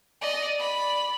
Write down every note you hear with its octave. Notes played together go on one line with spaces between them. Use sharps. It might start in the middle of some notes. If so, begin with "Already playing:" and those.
D5 D#5
D5 B5